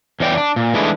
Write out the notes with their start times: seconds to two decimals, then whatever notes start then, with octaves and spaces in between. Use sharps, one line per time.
0.20 E2 C#4 D5 G5
0.37 D4
0.56 A#2
0.74 E3 G#3 A3 D4 E4 G#4